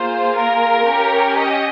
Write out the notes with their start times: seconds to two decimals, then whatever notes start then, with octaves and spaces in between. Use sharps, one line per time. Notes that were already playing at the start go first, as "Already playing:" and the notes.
Already playing: A#3 F4 G#4 C5
0.35 A#4
0.86 C#4 G4
1.37 D#5